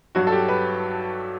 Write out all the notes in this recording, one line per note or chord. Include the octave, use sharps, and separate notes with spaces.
G2 F#3 F#4
A4
G4
B4